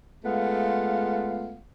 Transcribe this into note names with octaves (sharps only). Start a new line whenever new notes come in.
G#3 A3 B3 F4 F5 F#5